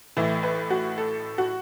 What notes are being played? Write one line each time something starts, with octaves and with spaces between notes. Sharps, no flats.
A1 A2 E3 E4
B4
F#4
A4
F#4